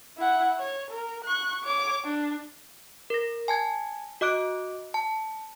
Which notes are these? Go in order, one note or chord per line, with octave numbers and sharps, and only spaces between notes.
E4 F#5
C#5
A#4
C#6 F#6
C#5 D6
D4
A#4 A#6
G#5 A5 G#6
F#4 D#5 D6 F#6 D7
A5